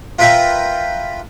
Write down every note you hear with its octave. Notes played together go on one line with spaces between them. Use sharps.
F4 A#4 B4 E5 F5 G5